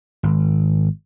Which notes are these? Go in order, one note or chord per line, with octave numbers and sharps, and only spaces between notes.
G#1